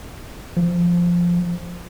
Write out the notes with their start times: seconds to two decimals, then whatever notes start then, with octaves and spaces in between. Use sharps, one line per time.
0.57 F3